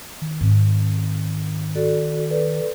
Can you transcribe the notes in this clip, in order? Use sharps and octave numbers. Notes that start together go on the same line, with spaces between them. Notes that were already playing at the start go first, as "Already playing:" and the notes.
D#3
G#2 C4
F#4 A4 D5
A4 B4 D5